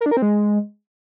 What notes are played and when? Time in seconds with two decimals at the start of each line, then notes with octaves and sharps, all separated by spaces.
0.01 A#4
0.06 D4
0.11 A#4
0.17 C4
0.22 G#3